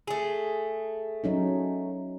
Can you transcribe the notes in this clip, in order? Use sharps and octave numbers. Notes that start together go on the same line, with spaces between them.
A3 G#4
F#3 C#4 D#4